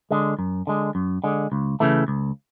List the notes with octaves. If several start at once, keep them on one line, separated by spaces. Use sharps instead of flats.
D3 G#3
F#2
D3 G#3
F#2
D3 G#3
C#2
C#3 E3 A3
C#2